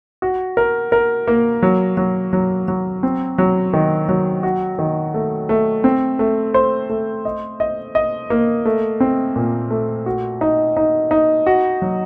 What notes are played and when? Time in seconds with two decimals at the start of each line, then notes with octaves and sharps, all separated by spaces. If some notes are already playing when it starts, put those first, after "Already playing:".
0.22 F#4
0.57 A#4
0.92 A#4
1.28 A#3
1.63 F#3
1.97 F#3
2.33 F#3
2.68 F#3
3.03 C4
3.38 F#3
3.73 D#3
4.09 F#3
4.43 F#4
4.79 D#3
5.14 A3
5.49 A3
5.84 C4
6.19 A3
6.54 C5
6.90 A3
7.25 D#5
7.60 D#5
7.95 D#5
8.30 A#3
8.65 A3
9.00 C4
9.36 A#2
9.71 A3
10.06 F#4
10.41 D#4
10.77 D#4
11.11 D#4
11.46 F#4
11.82 F#3